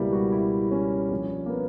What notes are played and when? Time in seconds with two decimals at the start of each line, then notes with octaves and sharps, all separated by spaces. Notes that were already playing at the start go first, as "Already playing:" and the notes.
Already playing: C#2 B2 G3 A#3 E4
0.13 F#4
0.32 E4
0.71 C#4
1.11 A#1 A#2
1.46 A#3
1.50 B3